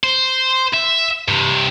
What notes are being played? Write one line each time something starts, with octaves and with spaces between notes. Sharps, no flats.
C5
E5
G2 C3